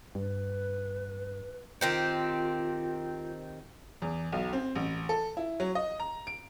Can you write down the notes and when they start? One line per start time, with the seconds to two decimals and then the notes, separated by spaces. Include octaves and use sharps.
0.15 G2 B4
1.81 D#3 C4 F4 G4
4.02 E2
4.32 B1
4.53 C4
4.75 A1
5.09 A4
5.37 E4
5.60 F#3
5.75 D#5
6.00 A#5
6.27 D7